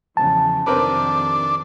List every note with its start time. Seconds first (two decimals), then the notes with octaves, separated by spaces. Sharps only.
0.17 E2 C#3 F3 A5
0.66 F2 C3 D#3 C4 D4 A#4 B4